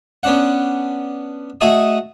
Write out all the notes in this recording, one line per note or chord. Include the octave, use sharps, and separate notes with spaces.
B3 C#4 D4 F#5
A3 F#4 G#4 D#5 A5 D#6